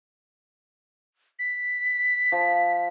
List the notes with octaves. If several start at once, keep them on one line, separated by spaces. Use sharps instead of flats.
B6
F3